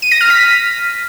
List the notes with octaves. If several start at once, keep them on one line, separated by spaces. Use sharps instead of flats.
D#7
A#6
F6
B6